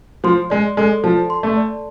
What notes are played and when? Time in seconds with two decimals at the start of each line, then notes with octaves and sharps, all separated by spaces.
0.24 F3 C6
0.50 G#3 D5
0.77 G#3 A4
1.04 F3 A5
1.30 C6
1.43 A3
1.56 D5